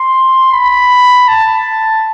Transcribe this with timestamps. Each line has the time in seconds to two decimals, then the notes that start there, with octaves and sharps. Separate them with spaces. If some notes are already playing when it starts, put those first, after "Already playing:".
Already playing: C6
0.52 B5
1.28 A5